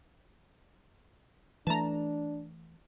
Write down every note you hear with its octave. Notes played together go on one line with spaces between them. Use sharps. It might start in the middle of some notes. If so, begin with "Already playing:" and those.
E3 A3 D4 A5 A#5